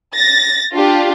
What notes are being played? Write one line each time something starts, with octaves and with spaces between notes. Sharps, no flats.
A6 A#6
D4 F4 G4